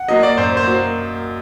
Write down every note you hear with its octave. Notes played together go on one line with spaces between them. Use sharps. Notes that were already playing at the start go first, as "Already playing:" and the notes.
Already playing: F#5
F#3 A#3 D#5
D5
F#2 C5
C5
F#3 A#3